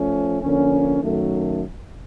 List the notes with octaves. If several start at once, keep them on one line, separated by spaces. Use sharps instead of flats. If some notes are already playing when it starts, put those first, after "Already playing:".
Already playing: F3 A3 C#4
D3 F3 A#3 C#4
F#2 D#3 F#3 A3